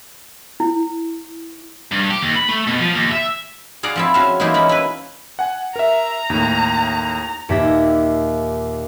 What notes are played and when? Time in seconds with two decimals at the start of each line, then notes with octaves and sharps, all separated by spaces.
0.60 E4
1.92 G2
2.11 G4
2.22 D#2
2.35 B5
2.49 A3
2.67 B2
2.79 F3
2.94 D#2
3.11 E5
3.83 G#4 D5 F5 F#5 A#5
3.96 F3 C4 E4
4.14 C#4 F#4 E5 F5
4.40 E3 G#3 A#3 D#4 E4
4.54 A#3 C#4 B5
4.69 E4 B4
5.39 F#5 G#5
5.76 A#4 E5 A#5
6.30 D#2 A2
7.49 D#2 A#2 G4 E5 G#6 A#6